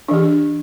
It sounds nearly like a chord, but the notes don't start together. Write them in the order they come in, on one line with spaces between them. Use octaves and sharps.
D4 E3 G4